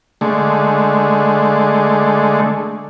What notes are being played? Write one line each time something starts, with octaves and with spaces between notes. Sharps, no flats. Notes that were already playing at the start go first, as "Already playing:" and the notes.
D3 G#3 A3